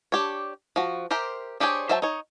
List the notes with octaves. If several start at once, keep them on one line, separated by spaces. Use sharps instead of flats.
D4 G4 C#5
F3 F#4
G4 A#4 C5 E5
D4 G4 G#4 C5 C#5
F#3 C5 E5 G5 A5
D#4 C#5